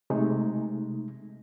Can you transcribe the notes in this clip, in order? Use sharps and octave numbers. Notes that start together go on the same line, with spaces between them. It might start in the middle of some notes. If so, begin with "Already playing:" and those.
C3 G#3 A3 D#4